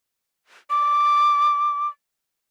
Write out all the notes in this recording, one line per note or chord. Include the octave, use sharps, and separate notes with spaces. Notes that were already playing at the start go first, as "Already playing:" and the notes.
D6